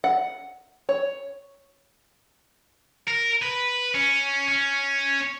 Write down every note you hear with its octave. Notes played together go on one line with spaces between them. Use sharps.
F#5
C#5
A#4
B4
C#4
C#4